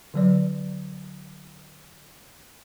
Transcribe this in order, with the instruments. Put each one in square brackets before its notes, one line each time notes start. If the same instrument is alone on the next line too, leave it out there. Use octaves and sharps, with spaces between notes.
[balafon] D3 F#3 D5